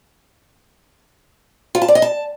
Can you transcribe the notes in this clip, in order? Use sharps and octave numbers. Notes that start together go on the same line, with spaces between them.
F4
A5
D5
D#5
A5